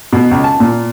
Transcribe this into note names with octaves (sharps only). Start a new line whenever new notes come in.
B2
C#2
A5
A#2